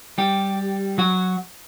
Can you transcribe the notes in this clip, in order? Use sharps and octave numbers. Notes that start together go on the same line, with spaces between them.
G3 G4
F#3 F#4